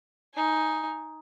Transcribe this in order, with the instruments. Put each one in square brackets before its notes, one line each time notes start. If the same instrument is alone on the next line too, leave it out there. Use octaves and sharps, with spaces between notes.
[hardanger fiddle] D#4 G#5